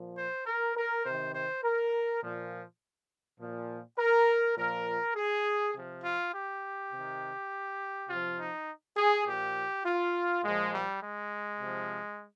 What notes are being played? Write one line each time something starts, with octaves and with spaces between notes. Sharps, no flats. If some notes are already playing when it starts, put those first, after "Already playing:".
Already playing: A#2 F3
C5
A#4
A#4
C3 D#3 C5
C5
A#4
A#2 F3
A#2 F3
A#4
A#2 F3 A#4
G#4
C3 F3
F4
G4
C3 D#3
C3 F3 F4
D#4
G#4
A#2 F3 G4
F4
A#2 F3 G#3
G3
G#3
C3 F3